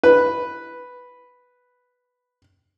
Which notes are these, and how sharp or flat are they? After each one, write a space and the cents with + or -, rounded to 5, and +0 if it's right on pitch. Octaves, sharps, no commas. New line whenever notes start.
B4 +0 B5 +0